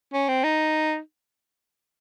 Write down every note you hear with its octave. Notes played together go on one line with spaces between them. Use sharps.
C#4
C4
D#4